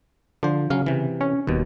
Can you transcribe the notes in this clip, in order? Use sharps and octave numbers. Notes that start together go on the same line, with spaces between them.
D3 F3 C5
C#3 F#3 C#4 F5
C3 E3
C#4
D#1 D#2 B2